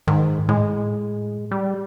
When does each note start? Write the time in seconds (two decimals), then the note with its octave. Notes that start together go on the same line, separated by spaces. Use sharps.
0.07 G#2 D#3
0.49 A2 G#3
1.51 G3